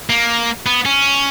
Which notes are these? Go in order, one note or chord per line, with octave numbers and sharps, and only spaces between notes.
A#3
B3
C#4